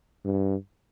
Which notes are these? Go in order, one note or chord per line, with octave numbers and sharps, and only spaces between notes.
G2